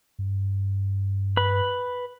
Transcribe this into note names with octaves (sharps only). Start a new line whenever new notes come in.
G2
B4 B5